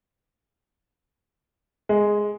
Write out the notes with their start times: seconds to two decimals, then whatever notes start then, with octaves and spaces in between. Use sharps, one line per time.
1.89 G#3